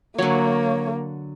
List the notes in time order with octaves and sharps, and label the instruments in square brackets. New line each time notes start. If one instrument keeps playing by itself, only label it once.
[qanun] D3 F#3 [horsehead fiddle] A#3 [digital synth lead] C#5